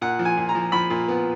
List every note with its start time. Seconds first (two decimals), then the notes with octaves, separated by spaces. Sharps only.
0.01 A#2 F#5
0.19 F3
0.25 G#5
0.37 A#2
0.49 A#5
0.55 F3
0.72 F3 B5
0.90 A#2
1.08 B3